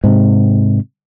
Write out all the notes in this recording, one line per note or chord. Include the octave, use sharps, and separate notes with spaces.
G#2 C3